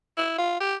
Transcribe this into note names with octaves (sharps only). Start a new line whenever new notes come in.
E4
F4
G4